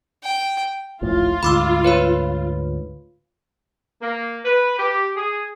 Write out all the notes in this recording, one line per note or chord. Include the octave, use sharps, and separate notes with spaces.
G5
D#1 A#1 A2 F4
D2 G#2 B5 D6 E6
B4 C#5 B5
A#3
B4
G4
G#4